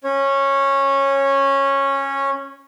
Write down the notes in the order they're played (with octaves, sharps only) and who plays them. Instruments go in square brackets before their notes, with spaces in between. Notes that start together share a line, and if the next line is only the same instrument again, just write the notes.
[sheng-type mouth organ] C#4 C#5